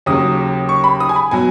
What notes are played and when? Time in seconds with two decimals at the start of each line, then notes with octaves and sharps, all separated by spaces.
0.06 D#2 C#3 F#3 D#6
0.69 C#6
0.84 B5
1.00 D#6
1.09 G#5
1.16 B5
1.31 B2 F#3 G#5